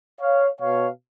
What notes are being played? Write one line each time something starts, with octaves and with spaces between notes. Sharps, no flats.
C#5 F5
B2 C#5 F5